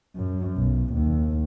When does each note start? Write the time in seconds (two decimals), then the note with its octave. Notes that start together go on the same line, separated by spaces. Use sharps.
0.16 F#2
0.57 B1
0.93 D#2